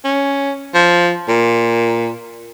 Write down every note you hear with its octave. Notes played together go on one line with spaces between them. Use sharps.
C#4
F3
A#2